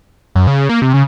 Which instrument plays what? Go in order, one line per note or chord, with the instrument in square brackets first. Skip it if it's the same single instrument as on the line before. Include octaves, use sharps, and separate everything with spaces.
[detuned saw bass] F#2
C#3
A#3
C3
C#3